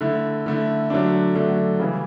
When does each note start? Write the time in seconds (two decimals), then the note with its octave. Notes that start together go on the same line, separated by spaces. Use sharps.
0.01 D3 A3 E4
0.46 D3 A3 E4
0.90 D3 F#3 A3 D4
1.35 D3 F#3 A3 D4
1.80 C#3 E3 G3